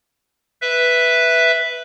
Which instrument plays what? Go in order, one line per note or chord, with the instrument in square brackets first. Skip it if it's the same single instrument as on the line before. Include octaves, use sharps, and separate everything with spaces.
[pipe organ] B4 E5